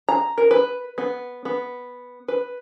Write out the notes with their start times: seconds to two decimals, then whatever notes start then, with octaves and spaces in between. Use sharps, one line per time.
0.09 A#5
0.38 A#4
0.51 B4
0.98 B3
1.45 B3
2.28 B4